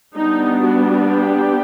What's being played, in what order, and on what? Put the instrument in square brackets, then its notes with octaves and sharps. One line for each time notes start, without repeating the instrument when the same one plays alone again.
[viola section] G3 B3 D4 D#4
F#4
G4